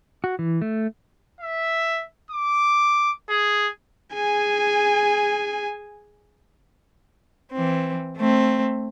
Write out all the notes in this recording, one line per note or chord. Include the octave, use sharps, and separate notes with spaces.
F#4
E3
A3
E5
D6
G#4
G#4 G#5
E3 C4
A3 C4